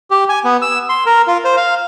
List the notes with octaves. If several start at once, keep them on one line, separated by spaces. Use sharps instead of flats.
G4
G#5
B3
E6
C6
A#4
F4
C5
F5